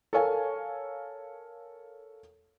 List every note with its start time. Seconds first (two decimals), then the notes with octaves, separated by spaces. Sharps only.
0.13 A4 A#4 C#5 F5 G#5